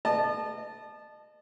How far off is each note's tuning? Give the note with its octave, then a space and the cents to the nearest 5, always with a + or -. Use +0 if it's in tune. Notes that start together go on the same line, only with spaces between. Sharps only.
D#5 -40 A5 -10